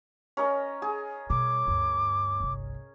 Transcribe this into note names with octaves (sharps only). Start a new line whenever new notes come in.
C#4 A#4 D#5
G#4
B2 G3 D6
D2 G2
G1 C2